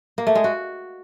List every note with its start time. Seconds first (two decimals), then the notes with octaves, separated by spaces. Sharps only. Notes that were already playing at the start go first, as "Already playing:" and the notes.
0.18 A#3
0.27 A3
0.35 G#3
0.44 F#4